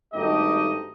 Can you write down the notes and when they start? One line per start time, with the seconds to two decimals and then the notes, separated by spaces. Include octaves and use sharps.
0.13 G#1 G2 A3 D#4 G4 D#5